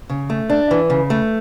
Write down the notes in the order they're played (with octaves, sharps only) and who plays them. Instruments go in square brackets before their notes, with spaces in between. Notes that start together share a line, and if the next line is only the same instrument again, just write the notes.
[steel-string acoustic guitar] C#3
A3
D4
E3
C#3
A3